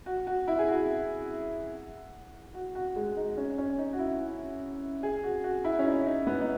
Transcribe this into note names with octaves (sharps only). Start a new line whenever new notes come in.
F#4
F#4
E4
G#4
F#4
F#4
F#4
G#3
D#4
C#4
C#4
D#4
F#4
E4
G#4
F#4
F#4
E4
C#4
D#4
D#4
B3
D#4